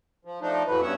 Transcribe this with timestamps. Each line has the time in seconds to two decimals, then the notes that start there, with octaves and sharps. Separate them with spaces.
0.25 F3
0.41 F3 A3 D4 D#4
0.67 F2 A2 E3 F#3 A3 B4
0.81 G2 B3 C#4 E5 F#5